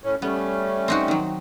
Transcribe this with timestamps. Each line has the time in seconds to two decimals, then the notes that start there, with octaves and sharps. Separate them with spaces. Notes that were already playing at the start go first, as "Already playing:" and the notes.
0.03 A2 C#4
0.22 G3 A3 B3 C#4
0.88 C4 D#4 F#4
1.08 D#3 F#3